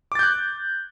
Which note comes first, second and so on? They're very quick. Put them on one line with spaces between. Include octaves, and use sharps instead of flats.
D6 A6 G6 F#6